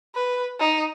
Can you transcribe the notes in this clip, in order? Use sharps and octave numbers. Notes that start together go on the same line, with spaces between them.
B4
D#4